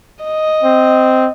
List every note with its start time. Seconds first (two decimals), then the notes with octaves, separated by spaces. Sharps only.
0.24 D#5
0.64 C4